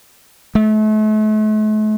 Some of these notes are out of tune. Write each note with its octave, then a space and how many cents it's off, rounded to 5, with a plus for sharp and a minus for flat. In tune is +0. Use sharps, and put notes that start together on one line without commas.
A3 -40